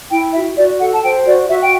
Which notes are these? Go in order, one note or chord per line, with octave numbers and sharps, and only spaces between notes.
E4 G5
F#4 E5
F#4 D5
A4 F#5
A5
C5 G5
F#4 D5
F#4 E5
G5